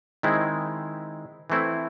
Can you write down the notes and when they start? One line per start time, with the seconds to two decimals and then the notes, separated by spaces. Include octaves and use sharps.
0.23 D#3 G#3 C4 E4
1.50 E3 A3 C4 E4